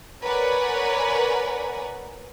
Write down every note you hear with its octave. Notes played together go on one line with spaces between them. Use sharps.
A#4 B4 C#5 D5 F#5 G#5